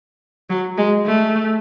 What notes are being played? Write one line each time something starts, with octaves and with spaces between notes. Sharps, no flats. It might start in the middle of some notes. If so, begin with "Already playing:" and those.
F#3
G#3
A3